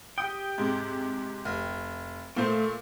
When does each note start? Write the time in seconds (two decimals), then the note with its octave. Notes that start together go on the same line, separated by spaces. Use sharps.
0.18 G4 G5 D#6
0.58 G#2 C3
1.45 F1
2.36 A#2 A3 C5